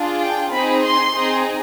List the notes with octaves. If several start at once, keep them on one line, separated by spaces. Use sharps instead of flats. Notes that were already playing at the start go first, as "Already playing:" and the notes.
Already playing: D4 F4 G#4
G5
C4 D#4 G#4 B5
C6
C4 D#4 G#4